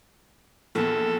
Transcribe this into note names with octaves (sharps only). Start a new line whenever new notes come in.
A#1 E2 A4